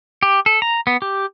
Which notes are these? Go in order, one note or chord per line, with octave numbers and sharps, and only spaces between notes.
G4
A4
A#5
B3
G4